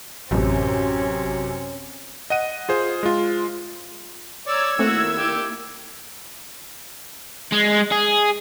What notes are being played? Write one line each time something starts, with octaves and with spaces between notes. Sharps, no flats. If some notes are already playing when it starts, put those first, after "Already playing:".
A1 F#2 C3 C4 C#4
D#5 F#5 D#7
F4 G#4 C5
G#3 F4
C#5 D5 A#5 E6 G#6
D#3 A3 A#3 C4 E4 F#4
G4
G#3
G#4